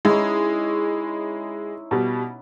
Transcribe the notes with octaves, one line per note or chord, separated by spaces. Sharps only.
G#3 C#4 D#4 E4
B2 G3